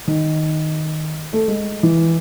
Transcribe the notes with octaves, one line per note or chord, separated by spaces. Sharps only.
D#3
A3
G#3
E3